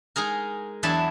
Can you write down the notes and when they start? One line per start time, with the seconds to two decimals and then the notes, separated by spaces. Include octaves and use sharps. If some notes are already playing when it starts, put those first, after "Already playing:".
0.16 G#3 D#4 G#4 A#4
0.83 E2 F#3 D4 E4 E5 A5